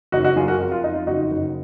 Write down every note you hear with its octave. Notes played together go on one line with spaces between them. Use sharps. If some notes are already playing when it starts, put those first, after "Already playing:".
F#1 D#4 F#4
D#4 F#4
F#3 F4 G#4
F#4 A#4
F2
F4
F2 D#4
F4
F#1 D#4 F#4
F#1